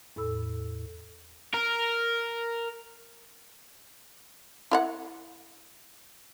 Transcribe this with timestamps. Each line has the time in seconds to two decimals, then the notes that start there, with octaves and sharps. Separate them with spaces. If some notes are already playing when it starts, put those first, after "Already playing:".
0.16 E2 A2 A4 B5 E6
1.54 A#4
4.71 E4 F5 F#5